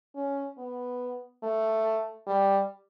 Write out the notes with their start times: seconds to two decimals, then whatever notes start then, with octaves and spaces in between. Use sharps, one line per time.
0.15 C#4
0.58 B3
1.43 A3
2.27 G3